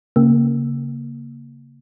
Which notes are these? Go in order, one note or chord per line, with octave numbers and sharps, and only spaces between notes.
C#3 A#3